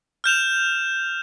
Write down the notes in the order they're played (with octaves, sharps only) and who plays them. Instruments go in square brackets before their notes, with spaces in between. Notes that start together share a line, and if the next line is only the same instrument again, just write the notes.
[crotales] F6 G6 E7 F7